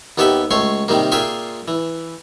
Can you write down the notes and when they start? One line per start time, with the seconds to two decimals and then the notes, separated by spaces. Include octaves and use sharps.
0.18 D#2 B3 G4 A4 E5 B5
0.51 C#2 A3 C#5 C6
0.88 C3 D#3 G3 A#3
1.12 A#2 F4 G#4 E5 G5 C6
1.68 E3